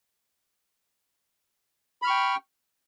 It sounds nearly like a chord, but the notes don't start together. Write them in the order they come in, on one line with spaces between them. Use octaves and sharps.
B5 F6 C#6 G5